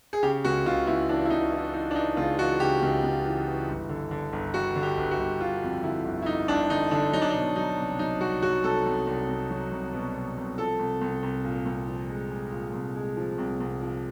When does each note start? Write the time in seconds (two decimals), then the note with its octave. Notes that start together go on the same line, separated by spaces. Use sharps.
0.13 G#4
0.23 C#3 G4
0.44 C#2 F#4
0.66 C#2 F4
0.87 C#2 E4
1.09 E3 D4
1.26 E4
1.30 C#2 D#4
1.52 E3 E4
1.74 E3 D#4
1.91 D4
1.95 E3 D#4
2.17 C#2 F4
2.39 E3 F#4
2.60 C#3 G4
2.82 C#2
3.03 C#2
3.25 E3
3.47 E3
3.68 G1
3.89 D3
4.11 D3
4.32 G1
4.54 G3 F#4
4.75 D3
4.83 G4
4.97 G1
5.11 F#4
5.19 G1
5.40 G1 F4
5.62 F2
5.83 D3 E4
6.05 G1
6.22 E4
6.26 G1 D#4
6.48 G1 D4
6.69 D3 D#4
6.91 D3 D4
7.13 F#3 D#4
7.22 D4
7.30 D#4
7.34 B2
7.56 F#3 D#4
7.78 C2
7.99 F#3 D#4
8.21 C2 F#4
8.42 F#3 F#4
8.64 C2 A4
8.86 C2
9.07 C2
9.28 C2
9.50 F#3
9.72 C2
9.93 B2
10.15 C2
10.37 C2
10.58 F3 A4
10.79 C2
11.01 C2
11.22 C2
11.44 A#2
11.65 C2
11.87 F3
12.09 G#3
12.31 G#3
12.52 A#2
12.73 C2
12.95 G#3
13.17 F3
13.38 C2
13.60 C2
13.82 F3